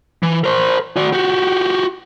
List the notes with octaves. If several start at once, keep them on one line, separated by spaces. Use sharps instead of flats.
E3
A#4 C5
F#4 D5
F#4 G4